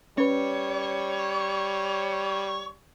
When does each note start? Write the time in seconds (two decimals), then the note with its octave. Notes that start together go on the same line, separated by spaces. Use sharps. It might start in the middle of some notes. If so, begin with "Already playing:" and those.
0.18 G3 C#4 B4 C#5